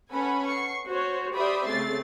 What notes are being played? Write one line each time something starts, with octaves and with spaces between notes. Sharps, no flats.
C#4 A4 B4 F#5 G#5 B5
C#6 C7
F#4 C5 C#5
G4 C5 D5 E5 B5 D#6
C#3 A3 C4 A6 C7